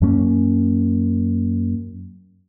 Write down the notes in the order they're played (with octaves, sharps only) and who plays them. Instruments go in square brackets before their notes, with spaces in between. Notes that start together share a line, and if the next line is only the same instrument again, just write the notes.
[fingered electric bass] F#2 F#3 A#3 C#4